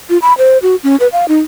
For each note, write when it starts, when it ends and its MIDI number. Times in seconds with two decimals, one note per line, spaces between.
0.10 0.18 65
0.22 0.33 83
0.38 0.58 72
0.62 0.76 66
0.84 0.96 61
1.00 1.08 71
1.13 1.28 77
1.28 1.39 63